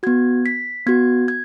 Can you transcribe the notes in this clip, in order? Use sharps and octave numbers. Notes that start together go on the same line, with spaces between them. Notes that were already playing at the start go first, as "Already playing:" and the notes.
B3 F#4 G#6
B6
B3 F#4 G#6
G#6